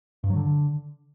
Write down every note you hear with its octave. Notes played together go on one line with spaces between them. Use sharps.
G2
F#3
D3